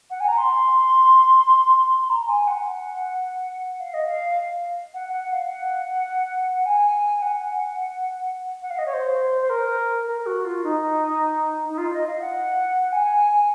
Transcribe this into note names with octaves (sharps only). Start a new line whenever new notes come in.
F#5
G#5
A#5
C6
C6
A#5
A#5
G#5
F#5
F5
D#5
F5
F#5
F#5
F5
F#5
G#5
F#5
F#5
F5
D#5
C#5
C5
C5
A#4
A#4
F#4
F4
D#4
D#4
F4
D#5
F5
F#5
G#5